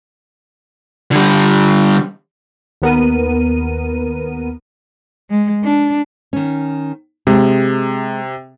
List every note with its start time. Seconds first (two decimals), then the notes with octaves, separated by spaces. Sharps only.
1.12 D3 G3
2.82 D#2 B3 A#4 D#7
5.30 G#3
5.64 D4
6.33 D#3 C#4
7.27 C3 G#3